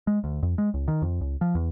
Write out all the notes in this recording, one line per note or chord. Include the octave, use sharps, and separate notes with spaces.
G#3
D2
F2
G#3
C#2
D#3
F2
C#2
F3
E2